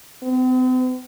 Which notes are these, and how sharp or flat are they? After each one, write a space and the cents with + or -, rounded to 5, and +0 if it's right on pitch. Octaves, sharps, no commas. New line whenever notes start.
C4 -45